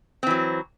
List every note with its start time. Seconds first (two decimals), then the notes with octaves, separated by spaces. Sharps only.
0.23 C4
0.27 E3
0.30 F#3